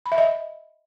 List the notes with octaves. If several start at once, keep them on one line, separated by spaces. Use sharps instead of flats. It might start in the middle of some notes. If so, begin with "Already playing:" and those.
B5
E5
D#5